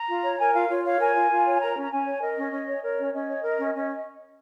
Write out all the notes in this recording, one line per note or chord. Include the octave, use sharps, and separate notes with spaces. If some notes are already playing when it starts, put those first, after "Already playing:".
Already playing: A#5
F4
C#5
A#4 G#5
F4 F5
F4 C#5
C#5 F5
A#4 G#5
F4
F4
C#5
G#5
A#4 A#5
C#4
A#5
C#4 G#5
C#5
A#4 D#5
C#4
C#4
C#5
A#4 C#5
C#4
C#4 D#5
C#5
A#4
C#4
C#4